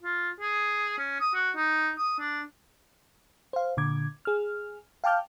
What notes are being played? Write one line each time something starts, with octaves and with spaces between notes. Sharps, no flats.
F4
G#4
C#4
D#6
F#4
D#4
D#6
D4
C5 F5
A#2 D3 D6 G#6
G#4 F6
F5 G5 A5 D6 F6 G6